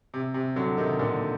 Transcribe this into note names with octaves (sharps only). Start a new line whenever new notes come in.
C3
C3
D3 F#3
C3 D#3
A#2 D3